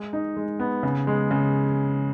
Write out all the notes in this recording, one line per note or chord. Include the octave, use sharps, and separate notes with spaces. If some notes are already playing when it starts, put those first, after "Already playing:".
Already playing: G#3
D#4
G#3
B3
C#3
G#3
C#3